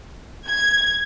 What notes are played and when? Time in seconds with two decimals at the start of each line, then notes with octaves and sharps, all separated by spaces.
0.47 G#6